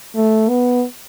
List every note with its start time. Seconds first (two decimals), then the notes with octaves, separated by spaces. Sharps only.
0.16 A3
0.49 B3